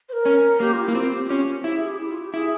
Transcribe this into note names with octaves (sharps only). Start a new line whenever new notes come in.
C5
A#4
C#4
A#3 G4
F4
A#3 E4
C4 F4
G4
C#4 F4
F4
E4 G4
G#4
G4
E4
F4
G4
E4 G#4